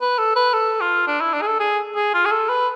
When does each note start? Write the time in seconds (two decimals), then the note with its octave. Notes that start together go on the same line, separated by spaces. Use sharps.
0.01 B4
0.19 A4
0.36 B4
0.54 A4
0.81 F4
1.07 D4
1.21 E4
1.34 D4
1.42 G#4
1.47 A4
1.60 G#4
1.96 G#4
2.14 F4
2.25 G#4
2.31 A4
2.49 B4